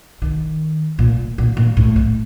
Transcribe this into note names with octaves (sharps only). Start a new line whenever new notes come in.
D#3
A#2
A#2
A#2
A2
A2